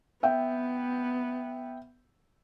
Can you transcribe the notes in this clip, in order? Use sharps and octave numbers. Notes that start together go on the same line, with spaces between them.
B3 E5 G5